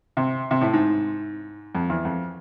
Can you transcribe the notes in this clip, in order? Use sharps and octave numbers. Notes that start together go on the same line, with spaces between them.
C3
C3
A2
G#2
F2
E2
F2